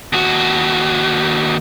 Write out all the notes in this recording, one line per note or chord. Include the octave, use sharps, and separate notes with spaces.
D#2 F#4